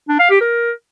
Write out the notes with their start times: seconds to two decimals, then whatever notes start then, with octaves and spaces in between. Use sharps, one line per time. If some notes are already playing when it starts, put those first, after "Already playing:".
0.09 D4
0.19 F5
0.30 G4
0.41 A#4